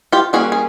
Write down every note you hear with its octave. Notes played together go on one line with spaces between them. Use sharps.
F4 G4
G3 A#3 C#4 F#4 G#4
G#4